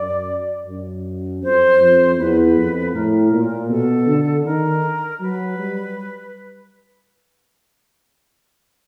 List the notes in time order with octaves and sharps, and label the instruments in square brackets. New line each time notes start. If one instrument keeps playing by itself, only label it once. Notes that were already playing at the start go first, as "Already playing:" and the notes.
Already playing: [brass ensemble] F#2 [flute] D5
[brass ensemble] F#2
[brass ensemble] F2 [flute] C5
[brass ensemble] F2
[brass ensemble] E2 [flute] B4
[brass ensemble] F2
[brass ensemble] A2 [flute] A#4
[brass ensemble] A#2
[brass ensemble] B2 [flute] A4
[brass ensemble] D3
[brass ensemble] D#3 [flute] A#4
[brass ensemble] F#3 [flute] B4
[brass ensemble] G3